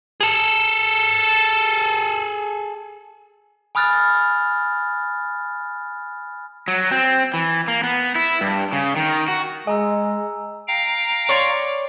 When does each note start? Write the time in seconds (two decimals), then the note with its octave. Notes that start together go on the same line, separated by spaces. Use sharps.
0.21 G#4 A4
3.75 G#5 B5 D#6 F6 F#6 A6
6.68 F#3
6.91 C4
7.34 E3
7.68 A#3
7.84 B3
8.16 E4
8.41 G2
8.73 C#3
8.96 D#3
9.28 F#4
9.67 G#3 D#5 G#5 A#5 E6
10.68 F5 G5 A#5
11.29 C#5 D5 C6